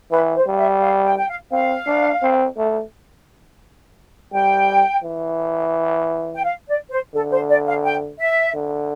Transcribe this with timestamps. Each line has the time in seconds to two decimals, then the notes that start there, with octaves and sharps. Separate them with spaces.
0.11 E3 B4
0.35 C5
0.47 G3
0.58 E5
0.81 F5
1.06 G5
1.17 G5
1.28 F5
1.52 C4 F5
1.87 D4
2.22 C4
2.58 A3
4.33 G3 G5
5.03 E3
6.34 G5
6.44 F5
6.68 D5
6.90 C5
7.14 D3 A4
7.32 C5
7.49 D5
7.67 F5
7.84 G5
8.19 E5
8.55 D3